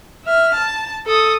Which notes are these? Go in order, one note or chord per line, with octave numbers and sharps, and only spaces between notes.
E5 F6
A5
A4 D#6